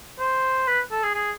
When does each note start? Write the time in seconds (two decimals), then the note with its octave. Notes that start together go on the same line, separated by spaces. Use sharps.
0.20 C5
0.68 B4
0.92 A4
1.03 G#4
1.14 G#4